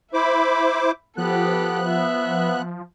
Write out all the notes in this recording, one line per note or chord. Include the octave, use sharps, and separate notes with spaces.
E4 C5 E5 B5 D6
F3 B3 G4 A4 F#6
E5